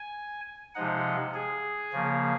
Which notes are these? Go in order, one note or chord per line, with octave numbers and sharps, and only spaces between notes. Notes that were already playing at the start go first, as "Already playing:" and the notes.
Already playing: G#5
C3 F3 G#3 D#4 F#5
G#4
C#3 F3 A#3